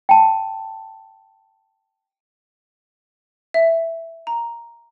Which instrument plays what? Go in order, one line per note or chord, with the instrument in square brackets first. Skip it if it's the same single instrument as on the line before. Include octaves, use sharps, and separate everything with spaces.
[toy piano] G5 A5
[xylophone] E5
A#5